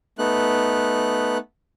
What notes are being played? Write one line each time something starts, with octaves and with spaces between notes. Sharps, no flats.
A3 B3 D#4 F#6